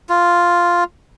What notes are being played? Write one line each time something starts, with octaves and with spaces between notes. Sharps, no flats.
F4